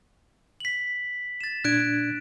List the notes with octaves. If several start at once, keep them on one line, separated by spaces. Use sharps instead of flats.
B6 F#7
A6 E7
A#2 D4 F#6 G#6 D7